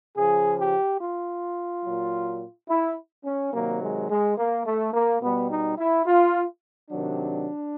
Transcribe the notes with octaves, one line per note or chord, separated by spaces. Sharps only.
C#3 F3 G#4
G4
F4
A#2 F#3
E4
C#4
C3 D#3 F#3 A#3
G#3
G#3
A#3
A3
A#3
B2 G3 B3
D#4
E4
F4
C3 D#3 F#3 D4